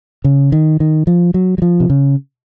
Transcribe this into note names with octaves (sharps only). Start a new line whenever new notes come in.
C#3
D#3
D#3
F3
F#3
F#3
F3
C3
C#3